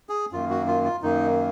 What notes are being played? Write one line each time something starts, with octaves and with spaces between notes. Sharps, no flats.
G#4
F#2 D#3 A#3 F4
F#4
F4
F4
F#2 D#3 A#3 D#4